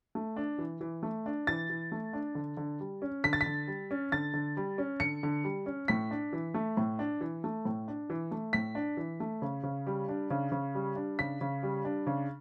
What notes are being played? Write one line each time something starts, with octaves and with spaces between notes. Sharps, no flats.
A3
D4
E3
E3
A3
D4
E3 A6
E3
A3
D4
D3
D3
G3
C#4
D3 B6
A6
B6
D3
G3
C#4
D3 A6
D3
G3
C#4
D3 C#7
D3
G3
C#4
A2 B6
D4
E3
A3
A2
D4
E3
A3
A2
D4
E3
A3
A2 B6
D4
E3
A3
C#3
C#3
G3
D4
C#3
C#3
G3
D4
C#3 B6
C#3
G3
D4
C#3